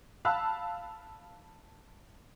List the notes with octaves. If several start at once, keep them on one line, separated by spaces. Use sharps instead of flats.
F5 A5 B5 E6 F#6